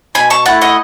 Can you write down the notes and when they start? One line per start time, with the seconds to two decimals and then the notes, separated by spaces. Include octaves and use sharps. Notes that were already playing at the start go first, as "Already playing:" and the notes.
0.15 B2 G#5 B5
0.30 A5 C#6
0.46 A3 E4 F#5 A5
0.62 D#5 F#5